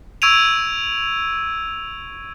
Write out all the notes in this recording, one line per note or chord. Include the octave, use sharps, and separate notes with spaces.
C#6 E6 G#6 D7 D#7 F7